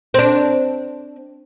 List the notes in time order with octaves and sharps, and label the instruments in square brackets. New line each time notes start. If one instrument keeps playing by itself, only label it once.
[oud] C4 D4